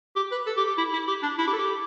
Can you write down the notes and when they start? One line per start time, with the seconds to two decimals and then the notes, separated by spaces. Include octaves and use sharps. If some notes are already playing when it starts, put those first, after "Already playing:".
0.16 G4
0.31 B4
0.46 A4
0.57 G4
0.67 G4
0.77 E4
0.93 E4
1.07 G4
1.22 D4
1.38 E4
1.47 G4
1.53 A4
1.58 G4